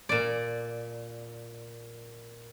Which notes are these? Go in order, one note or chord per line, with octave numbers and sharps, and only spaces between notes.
A#2 D5